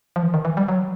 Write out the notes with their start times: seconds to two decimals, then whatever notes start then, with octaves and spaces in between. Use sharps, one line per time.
0.16 F3
0.23 E3
0.34 D#3
0.45 E3
0.57 G3
0.68 F#3